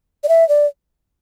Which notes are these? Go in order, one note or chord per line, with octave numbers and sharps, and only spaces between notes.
D5
E5
D5